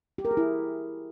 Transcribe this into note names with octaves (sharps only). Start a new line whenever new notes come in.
G4
A#4
G#4
E4